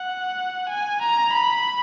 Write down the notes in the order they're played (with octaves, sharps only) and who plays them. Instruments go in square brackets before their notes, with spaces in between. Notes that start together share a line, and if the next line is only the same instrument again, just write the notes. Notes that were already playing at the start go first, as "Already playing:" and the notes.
Already playing: [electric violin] F#5
G#5
A#5
B5